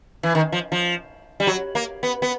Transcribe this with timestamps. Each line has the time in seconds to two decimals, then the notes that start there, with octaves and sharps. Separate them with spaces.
0.23 E3
0.35 D#3
0.52 F3
0.72 F3
1.40 G3
1.47 F#3
1.75 A#3
2.03 B3
2.22 B3